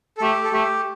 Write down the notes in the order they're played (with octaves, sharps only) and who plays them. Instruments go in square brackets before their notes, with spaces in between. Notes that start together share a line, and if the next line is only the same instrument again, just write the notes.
[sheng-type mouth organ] A4
[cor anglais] A3 [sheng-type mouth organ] G4
[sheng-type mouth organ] A4
[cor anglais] A3 [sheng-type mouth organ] G4